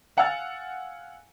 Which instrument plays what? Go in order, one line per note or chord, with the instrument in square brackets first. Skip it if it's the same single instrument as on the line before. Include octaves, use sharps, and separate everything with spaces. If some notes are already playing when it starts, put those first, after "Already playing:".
[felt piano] F5 F#5 G#5 E6 F6 A6